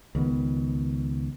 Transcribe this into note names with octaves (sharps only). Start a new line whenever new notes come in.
C#2 D#3 B3